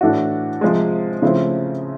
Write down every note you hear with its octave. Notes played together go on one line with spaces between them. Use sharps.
A2 E3 A3 D4 F#4
C3 F3 G#3
C#3 F3 A3 C4 E4